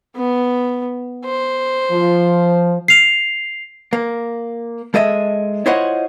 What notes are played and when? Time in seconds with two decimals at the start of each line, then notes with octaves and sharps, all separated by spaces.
0.16 B3
1.25 C5
1.91 F3
2.88 C7 F7
3.93 A#3
4.94 G#3 A4 D#5 E5
5.66 E4 F4 C5 C#5 D#5 F#5